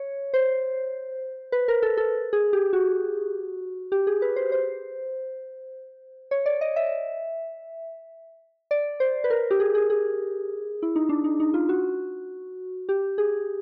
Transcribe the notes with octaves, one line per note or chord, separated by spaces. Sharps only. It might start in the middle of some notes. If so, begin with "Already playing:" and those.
Already playing: C#5
C5
B4
A#4
A4
A4
G#4
G4
F#4
G4
G#4
B4
C5
C5
C#5
D5
D#5
E5
D5
C5
B4
A#4
G4
G#4
G#4
G#4
E4
D#4
D4
D#4
D#4
F4
F#4
G4
G#4